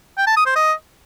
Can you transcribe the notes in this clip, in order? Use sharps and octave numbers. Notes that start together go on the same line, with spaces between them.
G5
A5
D#6
C5
D#5